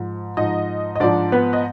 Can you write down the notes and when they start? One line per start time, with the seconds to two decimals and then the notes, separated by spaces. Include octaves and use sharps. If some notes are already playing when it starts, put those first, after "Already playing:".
Already playing: G#2 F3
0.37 G#2 F3 D#4 D#5
0.96 D#5
1.00 G#2 F3 D4 D5
1.32 B3 B4
1.53 D#5